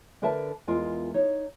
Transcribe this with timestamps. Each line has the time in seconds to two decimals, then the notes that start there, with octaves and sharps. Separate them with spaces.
0.22 D3 D4 A#4 B4 E5 A5
0.67 E2 G#3 F4 A#4
1.14 D#4 C#5